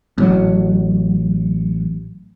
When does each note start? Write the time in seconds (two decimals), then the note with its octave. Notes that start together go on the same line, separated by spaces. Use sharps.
0.18 A1 F#3